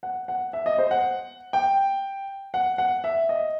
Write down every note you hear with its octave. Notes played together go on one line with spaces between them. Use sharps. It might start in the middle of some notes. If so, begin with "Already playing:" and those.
F#5
F#5
E5
D#5
C5
F#5
G5
F#5
F#5
E5
D#5